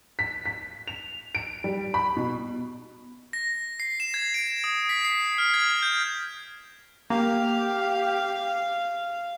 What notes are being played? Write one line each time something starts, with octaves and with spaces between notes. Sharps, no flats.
B6
B6
F7
D7
G3
B5
B2
A#6
C7
E7
G#6
D7
D#6
B6
C7
F6
G#6
G6
A#3 G4 F5